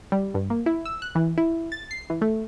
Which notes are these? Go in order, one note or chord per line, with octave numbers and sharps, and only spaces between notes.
G3
G2
A#3
E4
E6
F#6
E3
E4
A6
C7
E3
A3